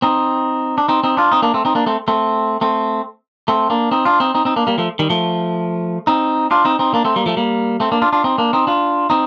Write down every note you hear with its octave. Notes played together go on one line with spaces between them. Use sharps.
C4 D#4
D4
C4 D#4
C4 D#4
D4 F4
C4 D#4
A#3 D4
A3 C4
C4 D#4
A#3 D4
A3 C4
A3 C4
A3 C4
A3 C4
A#3 D4
C4 D#4
D4 F4
C4 D#4
C4 D#4
C4 D#4
A#3 D4
G3 A#3
F3 A3
D#3 G3
F3 A3
C4 D#4
D4 F4
C4 D#4
C4 D#4
A#3 D4
A3 C4
G3 A#3
F3 A3
G3 A#3
A3 C4
A#3 D4
D4 F4
D4 F4
C4 D#4
A#3 D4
C4 D#4
D4 F4
C4 D#4